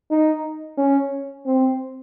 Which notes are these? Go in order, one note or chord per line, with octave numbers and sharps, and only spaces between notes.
D#4
C#4
C4